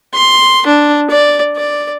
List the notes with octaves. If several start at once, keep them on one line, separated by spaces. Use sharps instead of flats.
C6
D4
D5
D5